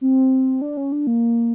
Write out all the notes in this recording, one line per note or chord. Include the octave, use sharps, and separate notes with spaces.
C4
D4
C#4
D4
A#3